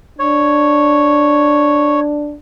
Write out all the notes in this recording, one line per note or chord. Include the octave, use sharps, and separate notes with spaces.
D4 C#5